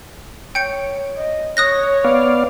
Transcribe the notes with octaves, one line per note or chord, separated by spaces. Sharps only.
C#5 G5 G6 C#7
D#5
C#5 D#6 F#6 A#6
B3 D5 F5